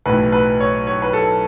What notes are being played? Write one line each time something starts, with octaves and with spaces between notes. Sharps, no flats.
B1 A2 E3 B4
B4
C#5
C#5
B4
A4